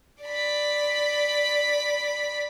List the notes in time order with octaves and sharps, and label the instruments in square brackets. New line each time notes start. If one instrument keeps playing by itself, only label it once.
[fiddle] D5 B5